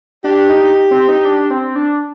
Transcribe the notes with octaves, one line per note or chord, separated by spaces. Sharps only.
D4 G4
D#4
C4
D#4
D4
C4
D4